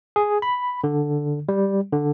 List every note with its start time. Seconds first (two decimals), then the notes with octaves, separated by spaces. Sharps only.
0.16 G#4
0.42 B5
0.84 D3
1.49 G3
1.93 D3